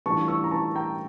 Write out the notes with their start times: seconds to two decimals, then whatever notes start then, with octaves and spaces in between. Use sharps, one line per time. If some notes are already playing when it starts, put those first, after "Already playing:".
0.06 A1 A2 G3 D4 F4 A5 C#6
0.28 C#6 E6
0.44 A#5
0.51 A5 C#6
0.75 G5 A#5